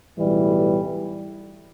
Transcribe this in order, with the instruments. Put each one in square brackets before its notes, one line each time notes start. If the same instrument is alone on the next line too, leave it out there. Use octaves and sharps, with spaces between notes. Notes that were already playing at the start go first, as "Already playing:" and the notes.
[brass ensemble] B1 A2 E3 G3